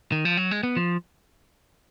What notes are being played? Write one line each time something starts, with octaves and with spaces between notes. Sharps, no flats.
D#3
F3
F#3
G#3
B3
F3